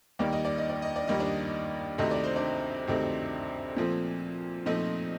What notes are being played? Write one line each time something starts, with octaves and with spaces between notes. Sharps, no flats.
D#2 D#3 G3 A#3 D5
D#5
D5
D#5
D5
D#5
D5
D#2 D#3 G3 A#3 D#5
D4 D5
D2 C3 D#3 A3 C4 D#5
D5
C5
D4 D5
D2 C3 D#3 A3 C4
A#2 F3 A3 C4
A#2 F3 A3 C4 D#4 D#5